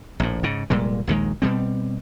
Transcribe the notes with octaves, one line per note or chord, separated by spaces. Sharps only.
A#1 A2
G#2 C#3
F1 A#2 G3 G#3
A#1 D#2 D#3 G#3
B2 G3 C4